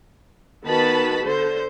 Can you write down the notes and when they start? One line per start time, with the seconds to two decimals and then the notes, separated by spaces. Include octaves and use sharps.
0.65 D#3 B3 F#4 B4 A5 B5
1.22 D3 C5